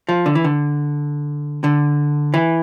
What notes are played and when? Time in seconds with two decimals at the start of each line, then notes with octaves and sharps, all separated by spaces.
0.09 F3
0.26 D3
0.35 E3
0.44 D3
1.64 D3
2.34 E3